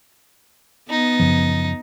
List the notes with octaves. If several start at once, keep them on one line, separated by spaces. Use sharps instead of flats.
B3 D#4
F#2 C#3 F3